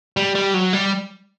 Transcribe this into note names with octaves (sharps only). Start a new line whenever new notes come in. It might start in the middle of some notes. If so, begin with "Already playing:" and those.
G3
G3
F#3
G3